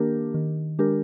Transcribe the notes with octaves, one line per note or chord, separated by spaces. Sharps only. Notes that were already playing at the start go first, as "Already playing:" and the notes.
Already playing: D#3 A#3 D4 G4 A#4
D#3
G#3 D4 G4 A#4